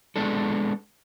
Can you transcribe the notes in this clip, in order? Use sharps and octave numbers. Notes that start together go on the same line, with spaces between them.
G#3 B3 D4 A4